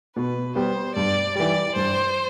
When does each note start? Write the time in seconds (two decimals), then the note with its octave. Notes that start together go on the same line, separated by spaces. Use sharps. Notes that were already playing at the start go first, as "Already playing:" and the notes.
0.16 B2 B4
0.55 G3 B3 C5
0.95 G2 D5
1.35 E3 G3 D5
1.75 G2 C5